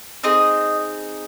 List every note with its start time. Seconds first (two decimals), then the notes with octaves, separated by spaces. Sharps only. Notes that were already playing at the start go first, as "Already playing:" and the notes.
0.24 C4 D#4 G#4 D#5